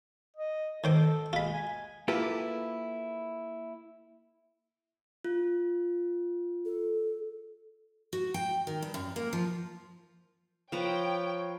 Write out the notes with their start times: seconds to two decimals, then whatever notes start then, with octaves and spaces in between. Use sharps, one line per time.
0.37 D#5
0.84 D#3 A4 C5 D6
1.33 G#3 F4 B5
1.53 G#5
2.08 A#3 E4 F4 G4 A4 B4
5.25 F4
6.65 A4
8.13 F#4
8.34 G5
8.67 D#3
8.82 G2
8.94 F#2
9.16 A#3
9.33 F3
10.72 F3 B4 C#5 G5 A#5